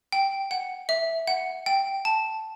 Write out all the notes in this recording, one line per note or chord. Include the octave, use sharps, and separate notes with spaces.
G5
F#5
E5
F#5
G5
A5